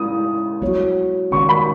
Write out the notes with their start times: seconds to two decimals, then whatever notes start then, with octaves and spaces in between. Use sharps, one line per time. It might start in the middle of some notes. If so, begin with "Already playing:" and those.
Already playing: G#3 C#4 E4 D#6
0.62 F#3 B3 F#4 C#5
1.32 D#3 G#3 C#4 C#6
1.49 B5